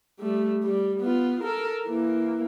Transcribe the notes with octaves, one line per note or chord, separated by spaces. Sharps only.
G3 A3
G3
B3 F4
A4 A#4
E3 A#3